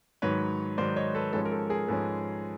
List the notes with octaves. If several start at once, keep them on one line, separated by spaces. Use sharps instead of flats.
G#2 D#3 F#3 B4 C#5
G#2 D#3 F#3 C5 D5
C#5 D#5
A4 B4
G#2 F3 G#3 C#4 A4 B4
A#4
A4
G#4 A#4
G#2 F3 G#3 C#4 A4 B4